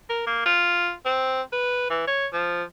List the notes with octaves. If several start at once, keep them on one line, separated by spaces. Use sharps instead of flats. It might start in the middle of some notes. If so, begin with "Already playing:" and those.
A#4
A#3
F4
C4
B4
E3
C#5
F3